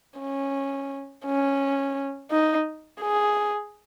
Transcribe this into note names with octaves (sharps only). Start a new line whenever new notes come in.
C#4
C#4
D#4
G#4